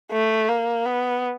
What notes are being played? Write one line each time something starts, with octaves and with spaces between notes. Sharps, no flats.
A3
A#3
B3